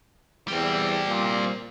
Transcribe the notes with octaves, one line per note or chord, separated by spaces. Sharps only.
E2 G3 C4
A#2